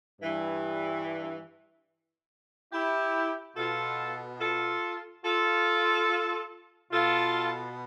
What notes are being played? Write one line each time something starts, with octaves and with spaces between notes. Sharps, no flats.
G2 E3
E4 G4
B2 F4 A4
F4 A4
F4 A4
B2 F4 A4